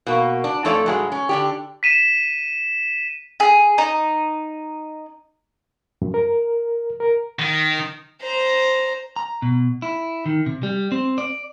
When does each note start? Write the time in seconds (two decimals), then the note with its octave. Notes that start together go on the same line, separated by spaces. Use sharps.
0.07 B2 A#3
0.44 D4
0.65 F2 A3 A4 C#5 D5
0.86 G2 F#3 G#3
1.12 C#4
1.29 D3 D4 G4
1.83 B6 D#7 E7
3.40 G#4
3.78 D#4
6.02 F#2
6.14 A#4
7.00 A#4
7.39 D#3
8.21 C5 A#5
9.16 A#5
9.42 B2
9.82 E4
10.26 D#3
10.46 C3
10.63 G3
10.92 C4
11.18 D5